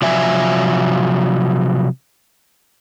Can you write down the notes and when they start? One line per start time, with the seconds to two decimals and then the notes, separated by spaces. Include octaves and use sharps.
0.02 C3 F3 F#3 D5 E5 G#5